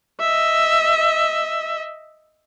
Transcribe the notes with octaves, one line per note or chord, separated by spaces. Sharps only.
D#5 E5